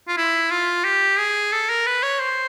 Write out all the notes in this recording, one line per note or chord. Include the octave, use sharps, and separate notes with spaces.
F4
E4
F4
G4
G#4
A4
A#4
B4
C#5
C5